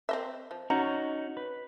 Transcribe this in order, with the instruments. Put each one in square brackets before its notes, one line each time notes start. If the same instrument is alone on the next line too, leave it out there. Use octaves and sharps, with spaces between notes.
[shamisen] C4 D#5 E5
F3
[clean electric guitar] C#4 D#4 F#4 [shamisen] A#5
[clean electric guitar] B4